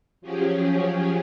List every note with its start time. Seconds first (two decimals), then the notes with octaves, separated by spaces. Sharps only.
0.21 F3 F#3 C#4 G4 G#4